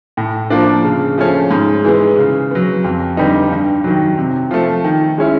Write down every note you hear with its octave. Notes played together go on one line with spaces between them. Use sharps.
A2
F3 A#3 D4
C#3
F3 A3 C#4
G#2
E3 G#3 B3
C#3
F#3 B3
F2
D3 G3 B3 D#4
G2
D#3 F#3
C3
F3 A3
D#3
G#3 C#4 E4